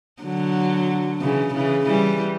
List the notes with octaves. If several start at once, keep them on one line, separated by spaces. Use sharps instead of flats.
D3 F#3
C#3 E3
C#3 E3
E3 G3